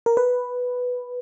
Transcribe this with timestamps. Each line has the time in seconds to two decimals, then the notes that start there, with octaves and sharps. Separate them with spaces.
0.06 A#4
0.17 B4